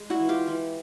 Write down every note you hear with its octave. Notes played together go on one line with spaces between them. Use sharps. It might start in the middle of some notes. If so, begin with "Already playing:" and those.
Already playing: G#3
E4 F#4
E3
F4 G4
E3